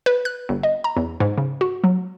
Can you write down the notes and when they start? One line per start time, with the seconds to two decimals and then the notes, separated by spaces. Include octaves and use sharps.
0.06 B4
0.25 F#6
0.49 G1
0.63 D#5
0.84 A#5
0.97 E2
1.20 G#2
1.38 C#3
1.61 F#4
1.84 F#3